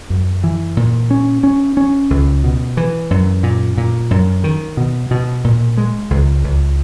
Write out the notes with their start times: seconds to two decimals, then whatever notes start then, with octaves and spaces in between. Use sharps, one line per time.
0.10 F#2
0.44 E3
0.77 A#2
1.11 C#4
1.43 C#4
1.77 C#4
2.10 C#2
2.44 B2
2.77 E3
3.11 F#2
3.43 A#2
3.77 A#2
4.11 F#2
4.44 D#3
4.77 B2
5.11 B2
5.44 A#2
5.78 G#3
6.10 C#2
6.44 C#2